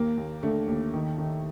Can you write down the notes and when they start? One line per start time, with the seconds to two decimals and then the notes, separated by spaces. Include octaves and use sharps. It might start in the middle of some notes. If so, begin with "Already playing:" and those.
Already playing: D#2 A#3
0.17 D#2
0.43 D3 A3
0.67 D#2
0.93 D#3
1.18 D#3